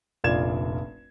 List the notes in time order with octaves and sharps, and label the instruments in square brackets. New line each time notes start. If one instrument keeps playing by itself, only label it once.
[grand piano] F1 A#1 F4 D5 G#6 E7